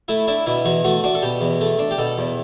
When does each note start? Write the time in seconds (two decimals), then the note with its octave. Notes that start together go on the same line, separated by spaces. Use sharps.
0.08 A3 E4
0.27 D4 E4
0.46 B2 E4
0.65 E2 F#4
0.84 A3 F#4
1.04 D4 F#4
1.15 A4
1.22 B2 G4
1.41 E2
1.60 A3
1.79 D4
1.91 G4
1.98 B2 A4
2.18 E2